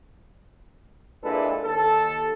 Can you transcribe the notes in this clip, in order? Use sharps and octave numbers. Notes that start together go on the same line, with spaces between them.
A#2 G#3 D4 E4 A4 B4
D#2 A4